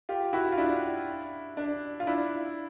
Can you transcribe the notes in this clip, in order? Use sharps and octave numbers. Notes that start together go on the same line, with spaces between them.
F4 G4
E4 F#4
F4
D4 E4
D4
F4
D4 E4